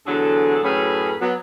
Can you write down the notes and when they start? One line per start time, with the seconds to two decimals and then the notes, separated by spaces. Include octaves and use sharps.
0.07 E2 D3 F#3 G#4 A4
0.64 F#2 A2 C#4 G#4 A4 B4
1.21 F#3 B3